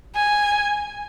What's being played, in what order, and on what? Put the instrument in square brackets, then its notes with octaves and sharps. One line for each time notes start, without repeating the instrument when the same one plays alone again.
[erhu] G#5